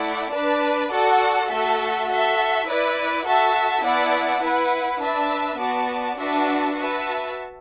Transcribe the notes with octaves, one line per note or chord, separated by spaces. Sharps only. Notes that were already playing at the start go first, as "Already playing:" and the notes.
Already playing: A3 E4 D5 F#5
D4 B4 D5 A5
F#4 A4 D5 F#5 A5
A3 F#4 A4 E5 A5
F#4 A4 E5
E4 B4 D5
F#4 A4 E5 A5
B3 E4 D5 F#5 A5
E4 B4 F#5
D4 B4 E5 A5
B3 F#4 D5 A5
D4 F#4 B4 E5 A5
F#4 B4 E5 A5